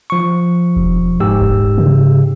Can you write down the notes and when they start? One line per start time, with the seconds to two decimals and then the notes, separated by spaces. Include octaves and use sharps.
0.10 F3 C#6
0.76 E1
1.20 G#2 G4 E6
1.41 D#1
1.78 C#3